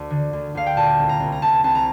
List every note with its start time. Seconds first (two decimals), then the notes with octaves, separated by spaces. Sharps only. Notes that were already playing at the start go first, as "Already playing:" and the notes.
Already playing: D2
0.10 D3
0.33 D2
0.55 D2 F5
0.66 G5
0.76 A#2 A5
0.99 C2
1.09 A#5
1.20 C2
1.32 A#5
1.42 C2 A5
1.64 C2 A5
1.75 A#5